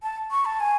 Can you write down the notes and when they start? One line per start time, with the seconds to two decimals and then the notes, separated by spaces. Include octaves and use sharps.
0.03 A5
0.31 C#6
0.45 A5
0.60 G#5